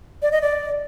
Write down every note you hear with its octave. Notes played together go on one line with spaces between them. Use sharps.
D5
D#5
D5